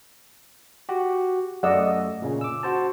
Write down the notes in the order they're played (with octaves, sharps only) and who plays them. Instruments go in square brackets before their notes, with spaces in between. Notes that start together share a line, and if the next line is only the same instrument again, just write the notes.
[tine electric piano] F#4 G4
[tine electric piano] F#2 A3 E6 [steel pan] D5 D#5 F#5
[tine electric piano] A#2 C#3 C#4
D6 E6
F#4 C5 A5